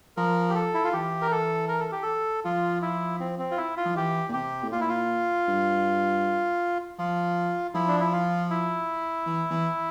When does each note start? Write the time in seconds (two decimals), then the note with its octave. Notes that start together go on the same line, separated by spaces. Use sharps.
0.17 F3 A#4
0.49 G4
0.55 A4
0.74 E4
0.84 F4
0.93 E3 G4
1.22 A#4
1.31 A4
1.69 A#4
1.80 A4
1.92 G4
2.03 A4
2.45 F3 F4
2.82 E4
3.20 C4
3.39 C4
3.51 F4
3.58 E4
3.77 F4
3.85 F3
3.95 E3 G4
4.29 A#2
4.33 C3 G4
4.63 A2
4.72 A#2 F4
4.81 E4
4.89 F4
5.48 G2
6.98 F3 F4
7.74 F3 E4
7.88 D4
8.00 E4
8.12 F4
8.50 E4
9.26 E3
9.51 E3